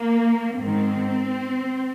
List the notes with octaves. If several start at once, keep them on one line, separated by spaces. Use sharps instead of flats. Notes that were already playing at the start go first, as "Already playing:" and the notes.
Already playing: A#3
G#2 D#3 C4